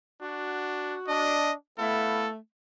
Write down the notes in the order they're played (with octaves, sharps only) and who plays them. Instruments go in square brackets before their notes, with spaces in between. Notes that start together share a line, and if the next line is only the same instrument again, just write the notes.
[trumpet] D4 [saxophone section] F#4
[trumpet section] D4 [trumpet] D#5
[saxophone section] A3 [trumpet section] B3 E4 F5 [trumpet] A4